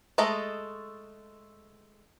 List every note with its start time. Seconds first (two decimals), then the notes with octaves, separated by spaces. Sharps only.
0.18 G#3 A3 A4 D#5 A#5